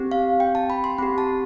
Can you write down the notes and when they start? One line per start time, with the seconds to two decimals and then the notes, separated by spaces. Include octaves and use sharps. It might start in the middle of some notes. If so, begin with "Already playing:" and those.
Already playing: C4 G4
0.11 F5
0.40 G5
0.55 A5
0.70 B5
0.84 C6
0.98 C4 G4 B5
1.18 A5